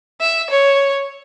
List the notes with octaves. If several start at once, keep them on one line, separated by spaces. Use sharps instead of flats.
E5
C#5